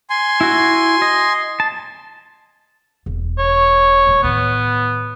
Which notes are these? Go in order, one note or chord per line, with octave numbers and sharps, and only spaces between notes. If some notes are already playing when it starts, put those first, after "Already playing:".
G#5 C6
E4 F#4
D#5
A5
E1
C#5
D#1 G#3
A2 D#3 B3